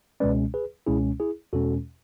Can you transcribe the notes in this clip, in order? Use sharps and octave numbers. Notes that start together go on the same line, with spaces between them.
C#2 B2 G#3 C#4 B4 D5
G#4 B4
C#2 B2 G#3 C#4 E4 G#4
E4 G#4
E2 B2 G#3 C#4 F#4 A4